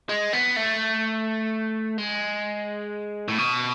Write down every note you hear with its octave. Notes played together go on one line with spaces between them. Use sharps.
G#3
B3
A3
G#3
A2
B2